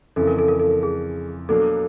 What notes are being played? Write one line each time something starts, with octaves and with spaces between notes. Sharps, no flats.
F2 C#3 E3 A4
A#4
A4
A#4
A4
G#4
B2 F#3 A#3 D4 A4